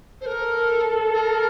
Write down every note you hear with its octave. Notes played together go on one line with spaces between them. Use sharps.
C5
A4 A#4
A#4